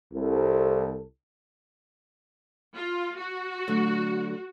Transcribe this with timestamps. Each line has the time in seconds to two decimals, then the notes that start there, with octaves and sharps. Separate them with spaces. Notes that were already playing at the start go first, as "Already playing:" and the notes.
0.14 C2 A4
2.76 F4
3.18 F#4
3.68 D3 F#3 A3